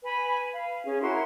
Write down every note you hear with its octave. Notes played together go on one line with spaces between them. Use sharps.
B4 G#5 B5
F5
C#4 G#4
E4 F#4 A#4 C6